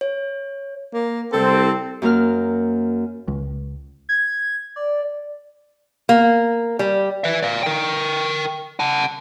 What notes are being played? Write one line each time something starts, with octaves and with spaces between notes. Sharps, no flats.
C#5
A#3
C2 C4 A4
F#2 A#3 A#4 F6
C#2
G#6
D5
A#3
G3
B4 E5
D5 F5
A#4 G5
F#5 A5